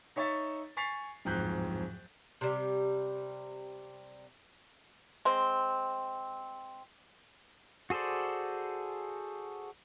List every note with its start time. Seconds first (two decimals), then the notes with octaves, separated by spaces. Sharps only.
0.16 D#4 C#5 E5 C#6 A6
0.77 G#5 C#6 A6 B6 C7 F7
1.25 D1 F2 G#2 F#6 G6
2.41 C3 G3
5.25 G#3 C4
7.90 F#4 G#4 A4 C5 D5